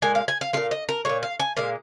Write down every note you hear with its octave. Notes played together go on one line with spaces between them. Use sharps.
A#2 G#3 G#5
F5
G#5
F5
A#2 G#3 F5
D#5
A#4
A#2 G#3 C#5
F5
G#5
A#2 G#3 F5